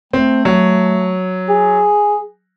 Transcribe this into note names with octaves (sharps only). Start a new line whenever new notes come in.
A3 C4
F#3
G#4